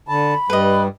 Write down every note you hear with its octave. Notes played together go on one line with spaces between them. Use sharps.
D3 A5 B5
G2 G3 B4 D#5